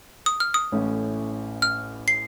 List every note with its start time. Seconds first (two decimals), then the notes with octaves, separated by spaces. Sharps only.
0.26 D#6
0.40 F6
0.54 D#6
0.72 A1 A2 A3 C#4
1.62 F6
2.08 C7